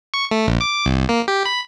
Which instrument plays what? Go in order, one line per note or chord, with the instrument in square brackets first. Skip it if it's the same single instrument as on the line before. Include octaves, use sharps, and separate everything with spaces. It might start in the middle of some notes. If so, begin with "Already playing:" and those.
[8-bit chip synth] C#6
A3
A#1
D6
C2
A#3
G4
B5